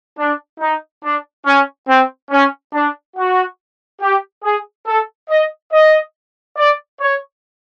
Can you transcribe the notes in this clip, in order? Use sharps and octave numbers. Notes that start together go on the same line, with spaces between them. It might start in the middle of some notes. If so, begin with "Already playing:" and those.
D4
D#4
D4
C#4
C4
C#4
D4
F#4
G4
G#4
A4
D#5
D#5
D5
C#5